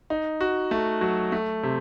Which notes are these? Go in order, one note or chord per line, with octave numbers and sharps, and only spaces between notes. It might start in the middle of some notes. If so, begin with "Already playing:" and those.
D#4
F#4
A3
F#3
A3
C3